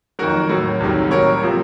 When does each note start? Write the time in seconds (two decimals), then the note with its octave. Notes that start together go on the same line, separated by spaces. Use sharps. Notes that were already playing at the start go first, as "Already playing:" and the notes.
0.19 F2 D#3 F#3 F#4 A#4
0.49 A2 F#3
0.80 C2 C3 D#3 F#3
1.11 A2 F#3 A#4 C#5
1.43 C3 F3